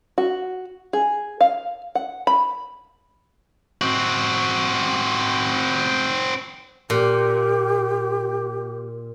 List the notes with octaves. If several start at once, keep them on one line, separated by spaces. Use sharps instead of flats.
F#4
G#4
F5
F#5
B5
C4 F#4
A#2 G4